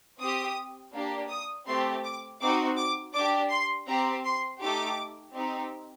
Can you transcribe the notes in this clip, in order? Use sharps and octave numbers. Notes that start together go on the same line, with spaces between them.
C4 G4 D#6
A#3 D4 G4
D#6
A3 C4 G4 C6
D6
C4 D#4 F#4 D6
D6
D4 G4 D6
C6
C4 G4 A#5
C6
A3 D#4 G4 D6
C4 D#4 G4